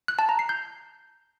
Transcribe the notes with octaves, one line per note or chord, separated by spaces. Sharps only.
F#6
A5
A#5
C7
G6